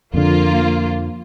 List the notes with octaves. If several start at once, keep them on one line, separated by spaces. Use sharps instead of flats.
F2 D3 F3 A#3 F4